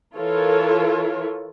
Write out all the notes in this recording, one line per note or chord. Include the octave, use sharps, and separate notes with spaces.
E3 F4 A4 A#4 C#5